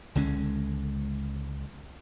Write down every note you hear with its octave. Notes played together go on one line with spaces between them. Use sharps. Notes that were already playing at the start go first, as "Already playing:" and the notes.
C#2 D3 G#3 C#4